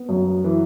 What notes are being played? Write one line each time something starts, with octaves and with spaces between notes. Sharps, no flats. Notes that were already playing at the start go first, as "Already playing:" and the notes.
Already playing: B3
F#2
E3